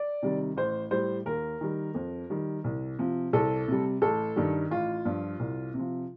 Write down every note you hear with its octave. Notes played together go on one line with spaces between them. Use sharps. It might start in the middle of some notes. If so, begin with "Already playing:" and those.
Already playing: D5
C3 D#3 G3
A1 C5
A2 G3 C5
D#2 A#4
D#3 G3
F2
D#3 G3
C2
C3 F3
C2 A4
C3 G3
A1 A4
G2 D#3 G3
A1 F4
G2 F3
C2
C3
F3